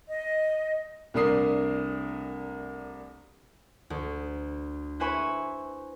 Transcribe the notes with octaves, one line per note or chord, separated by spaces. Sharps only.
D#5
C2 A3 D4 A#4 D#6 C7
D2
E4 B4 C5 G#5 B5 C#6